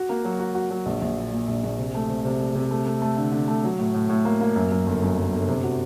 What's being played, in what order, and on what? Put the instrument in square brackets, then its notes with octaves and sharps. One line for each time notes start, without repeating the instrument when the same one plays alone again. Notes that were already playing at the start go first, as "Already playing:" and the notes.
Already playing: [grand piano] F#4
A#3
F#3
F#4
F#4
F#3
A#1
A#1
A#2
A#2
A#1
A#1
C3
A3
C3
C3
A3
C3
A3
A3
A3
D3
D3
A3
F#3
A2
A2
A2
A#3
A#3
F#2
F#2
G1
F#2
F#2
G1
C3
F#4